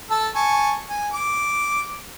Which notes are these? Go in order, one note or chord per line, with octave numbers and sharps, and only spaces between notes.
A4 A5 E6
G#5 A5 C#6
G#5
D6